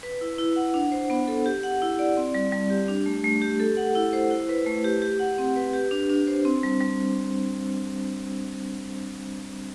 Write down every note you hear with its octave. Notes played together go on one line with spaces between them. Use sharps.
B4
E4
E4
F#5
D4
C5
B3
A4
G4
F#5
E4
D5
C4
G3
G3
G4
D4
A3
A3
G4
A4
F#5
E4
C5
E4
B4
A3
G4
G4
F#5
C4
B4
G4
D4
D4
C5
C4
G3
G3